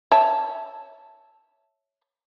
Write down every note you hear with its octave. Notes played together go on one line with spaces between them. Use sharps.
C#5 E5 A5